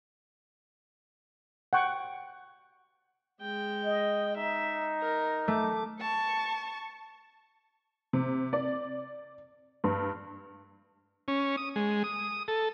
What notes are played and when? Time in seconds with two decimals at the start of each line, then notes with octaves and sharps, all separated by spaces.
1.73 F#5 G5 C#6
3.41 G#3 G5
3.84 D#5
4.36 D#4 E5
5.00 A#4
5.48 A3 D6
6.00 A5 C#6
8.13 C3
8.53 D5
9.84 G2
11.28 C#4
11.57 D#6
11.76 G#3
12.04 D#6
12.48 A4